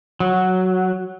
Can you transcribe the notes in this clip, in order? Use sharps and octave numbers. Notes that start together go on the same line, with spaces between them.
F#3